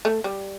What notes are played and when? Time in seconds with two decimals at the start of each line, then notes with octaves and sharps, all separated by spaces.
0.05 A3
0.24 G3